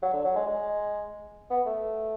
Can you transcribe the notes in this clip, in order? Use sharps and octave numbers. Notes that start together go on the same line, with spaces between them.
F#3
D3
F#3
G#3
G#3
B3
A3